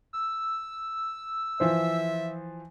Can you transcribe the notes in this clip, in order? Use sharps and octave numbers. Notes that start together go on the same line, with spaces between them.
E6
E3 F3 C5 E5